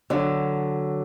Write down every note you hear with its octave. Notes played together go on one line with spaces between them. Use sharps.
D3 F#3